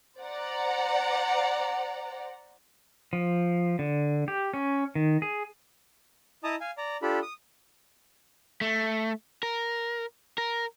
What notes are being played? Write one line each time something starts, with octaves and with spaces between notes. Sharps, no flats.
C5 D5 F#5 A#5
F3
D3
G4
C#4
D#3
G#4
E4 D#5 A5 A#5 D#6
F5 G#5
D5 A#5
D4 F4 G4 A4 B5
D#6
A3
A#4
A#4